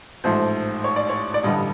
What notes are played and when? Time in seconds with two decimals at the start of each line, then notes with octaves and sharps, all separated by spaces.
0.24 A1 G#2 F3 A3 C5
0.84 C#5
0.96 D5
1.09 C#5
1.34 D5
1.43 A1 G2 D3 G3 D#5